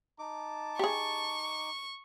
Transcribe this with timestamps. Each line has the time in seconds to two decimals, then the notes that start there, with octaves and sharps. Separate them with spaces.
0.19 D#4 A5 D6
0.79 G4 G#4 C#6